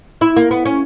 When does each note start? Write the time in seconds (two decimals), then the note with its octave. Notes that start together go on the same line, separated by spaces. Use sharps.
0.21 E4
0.37 A#3
0.51 B3
0.65 C#4